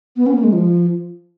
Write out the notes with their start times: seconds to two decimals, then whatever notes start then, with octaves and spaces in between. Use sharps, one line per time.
0.17 B3
0.26 C#4
0.35 A#3
0.44 G#3
0.53 F3